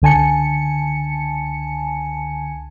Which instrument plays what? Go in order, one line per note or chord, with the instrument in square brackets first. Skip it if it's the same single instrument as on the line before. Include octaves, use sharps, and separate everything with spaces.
[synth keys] C#2 D3 G#5 A5 C#7